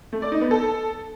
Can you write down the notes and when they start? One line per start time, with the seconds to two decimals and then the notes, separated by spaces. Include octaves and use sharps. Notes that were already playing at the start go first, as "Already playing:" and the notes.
0.13 A3
0.22 D5
0.32 D#4
0.41 B3
0.51 A4